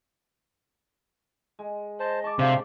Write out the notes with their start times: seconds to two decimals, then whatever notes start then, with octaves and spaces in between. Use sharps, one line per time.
1.59 G#3
2.00 C5 D#5 A5
2.24 D5 A5 C#6
2.39 C3 D4 G4 C5 F5